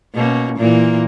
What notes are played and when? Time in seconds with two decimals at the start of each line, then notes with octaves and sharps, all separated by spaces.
0.14 B2 A#3 C#4
0.58 A#2 E3 A#3